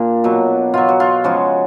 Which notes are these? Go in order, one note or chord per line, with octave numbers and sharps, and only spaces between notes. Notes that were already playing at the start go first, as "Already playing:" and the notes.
Already playing: A#2 D4
B2 F#3
B2 F#3 F4
F#4
F4
C#3 F3 G#3 F#4